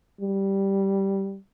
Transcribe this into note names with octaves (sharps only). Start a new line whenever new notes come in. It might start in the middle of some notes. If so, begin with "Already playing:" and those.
G3